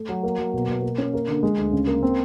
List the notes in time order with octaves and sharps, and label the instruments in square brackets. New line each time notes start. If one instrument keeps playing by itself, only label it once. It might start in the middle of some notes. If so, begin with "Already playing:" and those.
Already playing: [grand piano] A3
F#3
A#3
F#3
B2
B2
A#3
C#4
A#3
D3
G#3
D2
C#3
A#3
C4